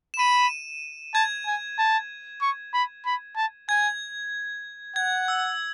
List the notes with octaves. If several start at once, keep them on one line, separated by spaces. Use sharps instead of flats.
E7
B5 D#7
A5 G#6
G#5
A5
C#6
B5
B5
A5
G#5 G#6
F#5 G#6
E6